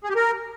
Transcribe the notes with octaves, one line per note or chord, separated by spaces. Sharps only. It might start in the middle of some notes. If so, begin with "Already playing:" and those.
G#4
G4
A#4